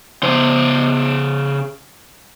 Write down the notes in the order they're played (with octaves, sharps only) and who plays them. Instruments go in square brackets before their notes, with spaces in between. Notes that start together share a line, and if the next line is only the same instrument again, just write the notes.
[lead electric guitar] C#3 C5